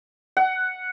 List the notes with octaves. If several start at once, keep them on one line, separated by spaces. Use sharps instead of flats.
F#5